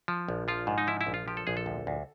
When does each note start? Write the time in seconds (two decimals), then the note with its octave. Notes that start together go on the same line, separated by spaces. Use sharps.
0.08 F3
0.28 A#1
0.48 F3 F4
0.67 G#2
0.78 D#4
0.87 F3 E4
1.01 E4
1.07 A#1
1.14 F4
1.28 F3 G4
1.37 A4
1.47 A#1 G#4
1.57 A4
1.66 D2
1.87 D2